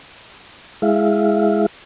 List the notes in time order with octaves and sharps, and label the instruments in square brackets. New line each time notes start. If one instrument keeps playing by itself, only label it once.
[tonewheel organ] G#3 E4 G#4 E5 F5